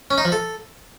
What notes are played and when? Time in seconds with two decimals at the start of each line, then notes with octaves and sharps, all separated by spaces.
0.11 C#4
0.18 D#4
0.25 F3
0.32 A4